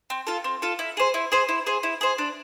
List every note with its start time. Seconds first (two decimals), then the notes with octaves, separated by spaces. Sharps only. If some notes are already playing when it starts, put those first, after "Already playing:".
0.10 C4
0.27 F4 A4
0.44 C4
0.62 F4 A4
0.79 E4
0.97 G#4 C5
1.14 E4
1.32 G#4 C5
1.49 E4
1.66 G#4 C5
1.83 E4
2.01 G#4 C5
2.18 D4